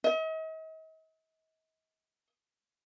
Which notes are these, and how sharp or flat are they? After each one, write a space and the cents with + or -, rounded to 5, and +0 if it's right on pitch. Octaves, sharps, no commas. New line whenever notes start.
D#5 +40